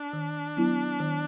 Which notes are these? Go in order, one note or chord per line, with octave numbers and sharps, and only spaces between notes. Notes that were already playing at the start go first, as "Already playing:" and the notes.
Already playing: D4
D#3
F#3 B3 E4
D#3